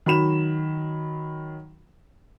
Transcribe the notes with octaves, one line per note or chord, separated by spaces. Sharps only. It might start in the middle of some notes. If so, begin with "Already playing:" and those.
D#3 F#3 B5 E7